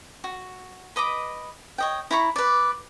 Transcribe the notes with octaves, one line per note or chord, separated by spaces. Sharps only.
F#4
B4 D#5 B5 D6
C#5 D#5 G5
E4 A#5 B5 C#6
B4 D5